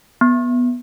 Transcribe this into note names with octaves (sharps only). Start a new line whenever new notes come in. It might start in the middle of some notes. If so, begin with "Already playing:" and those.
B3